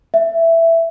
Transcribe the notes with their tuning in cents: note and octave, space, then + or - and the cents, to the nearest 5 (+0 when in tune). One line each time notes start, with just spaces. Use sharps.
E5 +5